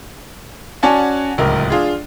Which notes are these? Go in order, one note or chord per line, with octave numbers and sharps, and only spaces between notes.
C#4 F#4 D5 F#5 G#5 A5
D1 C#2 A#4
D4 F4 G#4